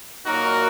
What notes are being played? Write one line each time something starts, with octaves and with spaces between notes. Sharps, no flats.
A#2 F#3 A#3 D#4 F#4 A#4